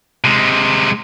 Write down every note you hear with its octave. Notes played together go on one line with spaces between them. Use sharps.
C3 G#3